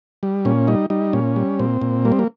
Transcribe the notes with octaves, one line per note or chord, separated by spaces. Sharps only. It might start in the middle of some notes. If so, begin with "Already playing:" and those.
G3
A#2 C#4
G3 D#4
G3 D#4
A#2 C#4
G3
A#2 C4
A#2
G3 A#3
C4
A#3